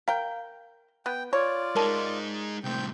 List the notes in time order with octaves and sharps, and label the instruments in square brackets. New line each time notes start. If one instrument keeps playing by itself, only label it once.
[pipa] A#4 G5 [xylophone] F5
[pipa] B3 [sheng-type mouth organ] G5
[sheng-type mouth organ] F4 D5 [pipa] C#5
[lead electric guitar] G#3 D#4 [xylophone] A#4 A5
[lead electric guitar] C2 A2 [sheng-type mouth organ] C4 G5 G6